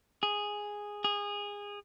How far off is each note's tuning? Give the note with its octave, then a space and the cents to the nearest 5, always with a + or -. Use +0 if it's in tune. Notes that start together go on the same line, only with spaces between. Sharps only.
G#4 -5
G#4 -20